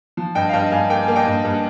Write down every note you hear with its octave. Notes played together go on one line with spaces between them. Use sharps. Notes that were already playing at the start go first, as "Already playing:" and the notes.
F3
G2 D#5 G5
F5
G2 D#5 G5
G2 F5 G#5
A#3 G5
G#5
A#3
D#5 G5
G2
G2